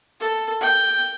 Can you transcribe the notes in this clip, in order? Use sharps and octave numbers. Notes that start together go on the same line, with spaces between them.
A4
G5